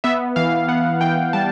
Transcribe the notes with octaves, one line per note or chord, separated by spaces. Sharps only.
B3 E5
E3 F5
B3 F#5
E3 G5
G3 A5